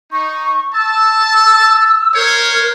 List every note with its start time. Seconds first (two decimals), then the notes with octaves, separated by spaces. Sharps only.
0.12 D#4 C#6
0.74 A5 E6
2.15 A#4 C5 C#5